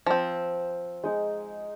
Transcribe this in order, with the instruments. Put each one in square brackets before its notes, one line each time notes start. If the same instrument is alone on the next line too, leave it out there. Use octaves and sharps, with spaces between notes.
[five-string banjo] F3 C4
[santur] G#3 D#4